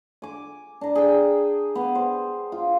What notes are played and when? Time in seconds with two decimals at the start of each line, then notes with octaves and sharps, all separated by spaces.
0.22 G#5 D6
0.81 D4 A#5
0.95 G#4 G5
1.75 B3 G#5
1.95 C5
2.52 F4